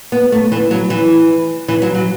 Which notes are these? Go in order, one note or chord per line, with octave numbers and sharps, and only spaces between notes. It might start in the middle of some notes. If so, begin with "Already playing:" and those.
B3
A3
E3
F#3
E3
E3
F#3
F#3